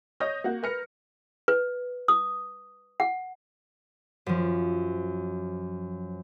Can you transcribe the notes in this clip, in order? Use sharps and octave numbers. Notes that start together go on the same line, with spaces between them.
C#5 D#5 D#6 G6 A#6
A#3 F#4 F#5
A#4 B4 F6 A#6 C#7
B4
D#6
F#5
F#2 F3